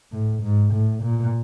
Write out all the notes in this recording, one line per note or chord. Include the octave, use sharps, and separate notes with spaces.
A2
G#2
A2
A#2